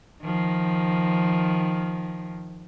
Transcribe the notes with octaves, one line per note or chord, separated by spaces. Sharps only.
D#3 F3